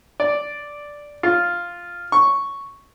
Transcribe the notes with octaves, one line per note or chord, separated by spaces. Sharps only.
D5
F4
C#6